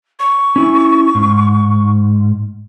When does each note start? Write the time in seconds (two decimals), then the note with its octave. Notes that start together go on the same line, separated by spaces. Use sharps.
0.19 C#6
0.56 C#4 E4 G#5
1.15 G#2